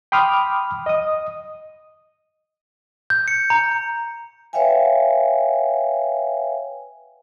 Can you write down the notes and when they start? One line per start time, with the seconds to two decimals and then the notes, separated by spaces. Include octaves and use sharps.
0.12 G5 B5 C6 D6 D#6 F6
0.86 D#5 D#6
3.10 G6
3.28 C#7
3.50 A#5
4.53 B4 C#5 E5 F5 G5 G#5